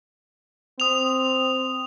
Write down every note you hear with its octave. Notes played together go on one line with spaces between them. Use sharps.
C4 D#6 F7